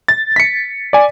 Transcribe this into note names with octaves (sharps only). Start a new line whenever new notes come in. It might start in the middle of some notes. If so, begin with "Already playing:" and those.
A6
B6 C#7
D5 G#5